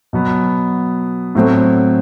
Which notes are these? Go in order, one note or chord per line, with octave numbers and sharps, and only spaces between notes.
B2 F#3 B3
A2 F#3 A3 C4